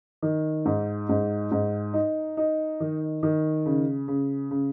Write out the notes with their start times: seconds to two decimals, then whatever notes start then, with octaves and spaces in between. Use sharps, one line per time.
0.22 D#3
0.65 G#2
1.09 G#2
1.52 G#2
1.94 D#4
2.37 D#4
2.80 D#3
3.23 D#3
3.66 C#3
4.08 C#3
4.51 C#3